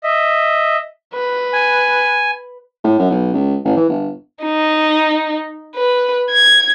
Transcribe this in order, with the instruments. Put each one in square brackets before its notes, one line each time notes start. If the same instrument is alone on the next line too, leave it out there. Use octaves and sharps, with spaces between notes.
[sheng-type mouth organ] D#5 E5
[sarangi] B4
[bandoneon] G#5
[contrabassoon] A2
F#2
B1
C#2
A1
E3
G1
[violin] D#4
B4
G#6